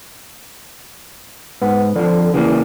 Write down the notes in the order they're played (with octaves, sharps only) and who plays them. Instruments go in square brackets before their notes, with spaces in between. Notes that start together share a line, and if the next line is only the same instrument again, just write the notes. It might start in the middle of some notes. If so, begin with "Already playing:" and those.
[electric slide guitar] G#2 [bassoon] B3
[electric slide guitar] F2 F3 [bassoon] D3
[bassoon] E2 [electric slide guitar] C#3 E3 A#3